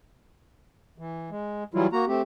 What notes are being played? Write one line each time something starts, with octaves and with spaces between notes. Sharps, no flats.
E3
G#3
E3 F#3 G3 E4 F4
A#3 F#4 A#5
A3 C4 G4